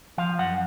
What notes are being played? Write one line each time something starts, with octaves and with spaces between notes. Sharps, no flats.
F3 F5
F#2 F#5